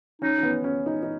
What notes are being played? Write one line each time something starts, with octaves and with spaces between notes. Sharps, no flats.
C#4 D#4
C#4
B3
C#4
D#4
D#4